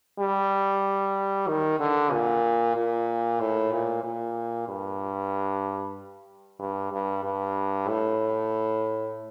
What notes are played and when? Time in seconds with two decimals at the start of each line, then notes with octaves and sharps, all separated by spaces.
0.19 G3
1.48 D#3
1.80 D3
2.12 A#2
2.76 A#2
3.40 A2
3.72 A#2
4.04 A#2
4.68 G2
6.60 G2
6.92 G2
7.23 G2
7.88 A2